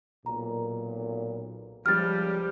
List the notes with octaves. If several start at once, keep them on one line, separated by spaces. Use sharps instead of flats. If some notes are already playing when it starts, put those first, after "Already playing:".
B1 A#2 A#5
C#2 F3 G3 F6 A6